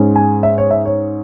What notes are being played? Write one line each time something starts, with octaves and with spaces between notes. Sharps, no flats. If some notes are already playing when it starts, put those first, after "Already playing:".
Already playing: G#2 G#3 C#4
G#5
E5
C#5
E5
C#5